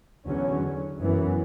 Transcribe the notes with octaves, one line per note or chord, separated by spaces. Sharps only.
E2 D3 F#3 C#4
F#2 E3 B3